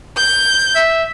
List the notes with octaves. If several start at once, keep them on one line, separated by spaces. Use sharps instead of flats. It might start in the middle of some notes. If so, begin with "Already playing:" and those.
G6
E5